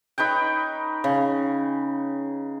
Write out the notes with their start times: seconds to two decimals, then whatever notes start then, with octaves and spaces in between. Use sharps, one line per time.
0.18 D#4 B4 C#5 G5
1.04 C#3